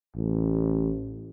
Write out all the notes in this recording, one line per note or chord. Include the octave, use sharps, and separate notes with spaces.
A1